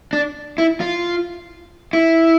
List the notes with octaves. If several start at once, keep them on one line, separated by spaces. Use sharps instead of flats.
D4
E4
F4
E4